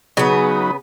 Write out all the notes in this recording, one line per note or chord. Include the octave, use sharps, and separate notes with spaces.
C#3 F#3 B3 D#4 B4